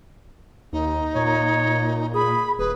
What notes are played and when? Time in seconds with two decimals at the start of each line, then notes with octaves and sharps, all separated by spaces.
0.73 D#2 D#4
1.15 A#2 C#5
2.14 G#4 B5
2.59 D#1 G#4 B4